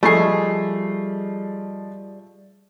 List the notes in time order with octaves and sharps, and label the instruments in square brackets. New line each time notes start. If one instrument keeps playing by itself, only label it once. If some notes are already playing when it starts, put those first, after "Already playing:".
[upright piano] F3 D#5 C7 [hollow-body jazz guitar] G3 G#4 [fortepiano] A3